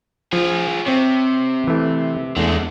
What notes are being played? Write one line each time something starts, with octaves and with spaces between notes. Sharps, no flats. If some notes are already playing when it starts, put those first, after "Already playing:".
F3 F4 G#4
C3 C4 C#5
E3 A3
E2 D3 G#3 A3